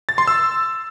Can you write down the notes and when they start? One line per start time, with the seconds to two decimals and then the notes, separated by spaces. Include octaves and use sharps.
0.09 A6
0.18 C6
0.27 E6